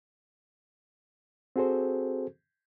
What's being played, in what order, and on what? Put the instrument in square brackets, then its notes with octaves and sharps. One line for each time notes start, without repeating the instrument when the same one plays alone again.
[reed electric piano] C4 F#4 G#4 A4 C5